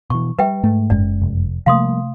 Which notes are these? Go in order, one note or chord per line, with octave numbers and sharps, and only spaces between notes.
B2 E3 C#6
G3 B4 E5 G5
G#2 A3
F#1 F#2 G#3 D5
F1
C3 F3 G3 A3 A#3 F5 C6 D#6